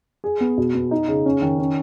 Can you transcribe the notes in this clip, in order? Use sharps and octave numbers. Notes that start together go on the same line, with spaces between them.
G#4
B3
B2
B3
D#4
C#3
C#4
D#3
C#4